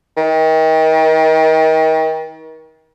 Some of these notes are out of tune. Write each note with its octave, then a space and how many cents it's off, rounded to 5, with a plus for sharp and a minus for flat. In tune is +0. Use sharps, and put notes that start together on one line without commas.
D#3 +35